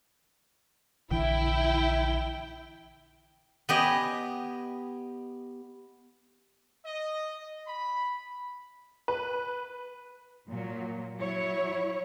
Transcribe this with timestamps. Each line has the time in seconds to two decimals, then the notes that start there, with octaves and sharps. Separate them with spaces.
1.11 A#1 D3 E3 E4 G5
3.69 B3 G4 D#5 G#5
6.85 D#5
7.67 B5
9.08 B4
10.50 A#2 F#3
11.16 F#3 E4 C#5